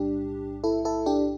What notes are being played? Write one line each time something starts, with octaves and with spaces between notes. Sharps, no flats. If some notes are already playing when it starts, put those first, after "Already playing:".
Already playing: B1 A2 G3 D4 G4
E4 A4
E4 A4
D4 G4